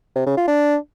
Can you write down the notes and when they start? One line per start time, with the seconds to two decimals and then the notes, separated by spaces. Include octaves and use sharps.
0.15 C3
0.26 C#3
0.37 F4
0.48 D4